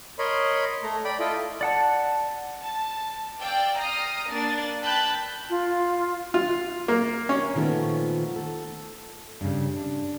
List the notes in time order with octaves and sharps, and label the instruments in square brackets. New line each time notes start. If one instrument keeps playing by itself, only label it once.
[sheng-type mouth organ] A#4 C#5 D#5 B5 C6
A3 A#5
D5 G5 B5
E4 F4 A4 D#5 G5
[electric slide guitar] D5 F#5 A5
[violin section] A5
D5 F5 G5 D6 E6
A#5 D#6 F6 A#6 C7
A#3 D4 D5 A6
G5 A5 B5 E6 F#6 G6
[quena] F4
[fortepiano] F4
A#3
C#4
[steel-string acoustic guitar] A#2 D#3 F3 A3 B3
A4
G2 C#3
D4